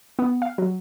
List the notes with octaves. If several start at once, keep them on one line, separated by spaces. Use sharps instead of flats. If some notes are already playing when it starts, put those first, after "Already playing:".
B3
F5
F#3